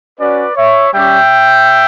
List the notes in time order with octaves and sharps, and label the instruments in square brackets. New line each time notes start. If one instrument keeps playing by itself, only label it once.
[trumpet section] C#4 F#4 B4 D5
C#5 E5
G3 C#4 G4 E5 G5